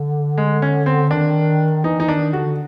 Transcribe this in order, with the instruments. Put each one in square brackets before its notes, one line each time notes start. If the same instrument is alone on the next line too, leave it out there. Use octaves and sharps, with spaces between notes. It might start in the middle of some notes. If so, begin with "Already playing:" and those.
Already playing: [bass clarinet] D3
[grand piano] G#3
C#4
C4
[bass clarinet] D#3 [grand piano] D4
[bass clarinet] E3 [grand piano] D#4
[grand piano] D#4
[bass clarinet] D#3 [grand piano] D4
[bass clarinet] D3 [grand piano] F#4